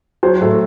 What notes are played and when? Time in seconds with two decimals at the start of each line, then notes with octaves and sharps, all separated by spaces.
0.23 F#3 C5
0.41 A2 A4